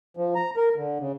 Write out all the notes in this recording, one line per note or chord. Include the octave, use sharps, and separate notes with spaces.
F3
A#5
A#4
D3
C#3